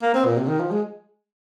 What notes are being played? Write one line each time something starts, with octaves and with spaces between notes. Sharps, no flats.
A#3
C4
A#2
C3
D#3
F3
G#3